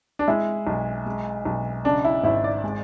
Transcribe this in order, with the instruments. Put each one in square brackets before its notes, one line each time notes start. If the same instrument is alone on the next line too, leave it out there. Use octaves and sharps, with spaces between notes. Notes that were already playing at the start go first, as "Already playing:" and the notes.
[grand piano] D4
G#3 E4
B1
G#3
B1
C#3 D4
E4
G#1 E4
D5
G#3